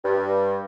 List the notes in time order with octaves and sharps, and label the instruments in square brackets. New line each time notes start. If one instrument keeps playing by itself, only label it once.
[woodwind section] G2